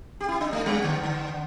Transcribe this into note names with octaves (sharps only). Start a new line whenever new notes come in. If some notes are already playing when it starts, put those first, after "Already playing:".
G4
E4
D4
A3
G3
D3
D3